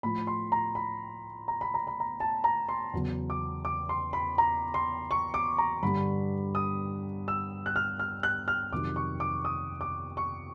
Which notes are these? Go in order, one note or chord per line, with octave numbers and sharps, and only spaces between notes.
A2 F3 B5
C6
A#5
B5
A#5
B5
A#5
B5
A#5
A5
A#5
C6
E2 C#3 F#3
D6
D6
C6
B5
A#5
C6
C#6
D6
A#5
G2 D3 G3 B5
D#6
E6
F#6
F6
F6
F#6
F6
F2 C3 D#3 F#3 D6
C#6
D6
D#6
D6
C#6